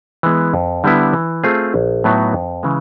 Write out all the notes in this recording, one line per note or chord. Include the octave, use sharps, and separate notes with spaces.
E3 G#3 B3
F2
D3 G3 B3 E4
E3
A3 C4 F4 G#4
A#1
A2 F#3 B3 D#4
F2
C#3 E3 G#3